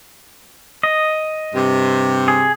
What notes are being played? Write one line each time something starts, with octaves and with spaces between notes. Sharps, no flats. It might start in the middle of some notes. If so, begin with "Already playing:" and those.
D#5
G2 C3
G#4